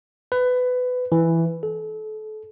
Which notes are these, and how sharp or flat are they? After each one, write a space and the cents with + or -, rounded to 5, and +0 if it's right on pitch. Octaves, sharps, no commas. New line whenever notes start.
B4 +20
E3 +5
A4 -30